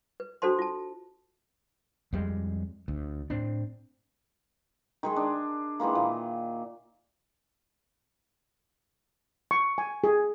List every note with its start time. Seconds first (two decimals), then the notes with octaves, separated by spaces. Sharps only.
0.20 B4
0.42 D4 F#4 A4 C5 A5 C6
0.59 F4 A5
2.13 F2 G3 G#3
2.88 D2
3.30 A2 C4 D4
5.03 D#3 G#3 G#4
5.16 D4
5.80 D#3 E3 G#3 A#3
5.95 A#2
9.51 C#6
9.78 G#5
10.04 G#4